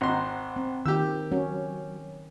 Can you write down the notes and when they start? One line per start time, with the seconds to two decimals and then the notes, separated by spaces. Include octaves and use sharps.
0.01 G#1 C5 F#5 A#5 C6
0.56 C4
0.86 D#3 G4 E6
1.32 F#3 C#4